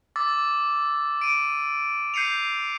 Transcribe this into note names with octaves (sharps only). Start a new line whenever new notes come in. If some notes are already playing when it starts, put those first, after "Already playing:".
D6 E6 A6
D7 D#7
G6 C7 C#7 D#7 F7